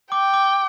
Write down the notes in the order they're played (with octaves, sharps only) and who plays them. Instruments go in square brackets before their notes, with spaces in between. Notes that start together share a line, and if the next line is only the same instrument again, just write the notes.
[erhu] G5 [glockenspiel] D6
[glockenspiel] D6